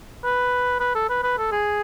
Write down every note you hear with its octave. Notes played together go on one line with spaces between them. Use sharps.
B4
B4
A4
B4
B4
A4
G#4